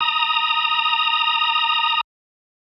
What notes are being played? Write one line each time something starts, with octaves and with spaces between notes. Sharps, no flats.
A#5 D#6